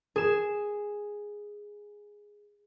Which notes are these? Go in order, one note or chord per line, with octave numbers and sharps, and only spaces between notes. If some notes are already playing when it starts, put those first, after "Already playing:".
G#4 E7